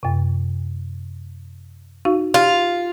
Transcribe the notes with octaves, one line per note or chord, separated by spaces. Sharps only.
F#2 C3
D#4 F#4 F5
F4 G4